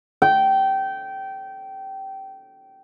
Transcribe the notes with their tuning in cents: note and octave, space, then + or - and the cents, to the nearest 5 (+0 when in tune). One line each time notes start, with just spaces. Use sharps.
G5 -20